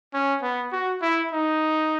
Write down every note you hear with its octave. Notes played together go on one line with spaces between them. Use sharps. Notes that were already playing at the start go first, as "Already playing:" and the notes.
C#4
B3
F#4
E4
D#4